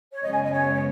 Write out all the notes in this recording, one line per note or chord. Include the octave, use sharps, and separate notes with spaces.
C#5
F#2 C#3 G#3 B3 D#5
G#5
D#5
C#5
C#5